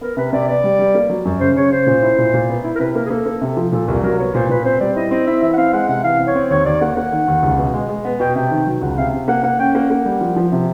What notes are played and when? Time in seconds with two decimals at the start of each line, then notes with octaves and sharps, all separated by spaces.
0.01 B3 A#4
0.17 C3 B4
0.33 C3 D5
0.48 B3 D5
0.64 G3
0.79 G3
0.95 A#3
1.10 F#3
1.25 F#2
1.40 C#3 C5
1.56 C#3 C#5
1.71 C#3 C5
1.87 A#2
2.02 E4
2.18 A#2
2.34 A#2
2.49 B3
2.64 E4
2.75 A#4
2.79 C3 B4
2.95 A#3 A#4
3.05 G#4
3.10 A#3 A4
3.26 A#3
3.41 C3
3.57 F3
3.72 A#2 A4
3.88 C2 A#4
4.03 F#3 A#4
4.19 B3 C#5
4.34 A#2 C5
4.49 A#2 B4
4.65 C4 C5
4.80 G3 D5
4.96 E4 D#5
5.11 C4 D#5
5.27 E4 E5
5.42 E3 E5
5.53 F#5
5.57 C4 F5
5.73 G#3 F#5
5.89 C3 F#5
6.04 E3 F5
6.19 C4
6.27 C#5
6.35 C4
6.50 D#2 C#5
6.66 D#2 D5
6.81 A#3 F#5
6.96 A#3 F#5
7.12 D#3
7.28 D#2
7.43 C#2
7.58 B2
7.74 G#3
7.89 G#3
8.05 B3 F#5
8.20 B2 G5
8.36 C3 G5
8.51 D#3
8.67 F#3
8.82 C#2 F#5
8.97 C3 F5
9.13 C3
9.28 A#3 F#5
9.43 A#3 F#5
9.59 C#4 G5
9.75 A#3 F#5
9.90 A#3
10.06 G3
10.21 F3
10.36 F3
10.52 C3